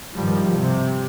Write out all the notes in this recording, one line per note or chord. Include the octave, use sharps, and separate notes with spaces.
G2 D#3 F3 G3
C3